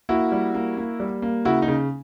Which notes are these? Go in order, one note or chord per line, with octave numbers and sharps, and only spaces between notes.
A#3 E4 F#4
G3
A#3
A#3
G3
A#3
C#3 E4 F#4
D#4
C#3